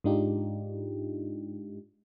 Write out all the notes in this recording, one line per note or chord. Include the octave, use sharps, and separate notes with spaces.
G#2 G#3 D4 D#4 F4 G4